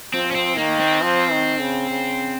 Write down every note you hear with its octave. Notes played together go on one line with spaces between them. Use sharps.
F3 C4
C#4
C4
D#3 A#3
C4
F3
D#3
C#3
C#3